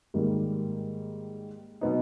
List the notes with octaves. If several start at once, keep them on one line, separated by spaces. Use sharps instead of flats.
G#2 D#3 G3 A#3
B2 F#3 B3 D#4